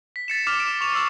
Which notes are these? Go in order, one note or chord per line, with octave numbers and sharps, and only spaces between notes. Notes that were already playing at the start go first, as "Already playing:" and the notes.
B6
A6 C#7 E7
D6 F6 B6 C#7 E7 F7
D7
C#6 F7
C#6 E6 C7